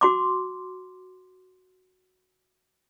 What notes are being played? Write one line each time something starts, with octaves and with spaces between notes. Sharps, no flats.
F#4 C6 D6